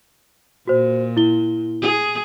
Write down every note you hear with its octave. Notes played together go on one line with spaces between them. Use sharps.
A#2 F#4 C5
E4 G7
G#4